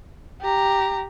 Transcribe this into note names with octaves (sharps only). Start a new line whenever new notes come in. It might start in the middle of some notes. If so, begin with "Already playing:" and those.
G4 A#5